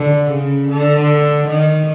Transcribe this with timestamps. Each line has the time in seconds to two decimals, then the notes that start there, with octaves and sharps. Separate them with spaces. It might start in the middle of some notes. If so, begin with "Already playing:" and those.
Already playing: D3
0.31 C#3
0.70 D3
1.47 D#3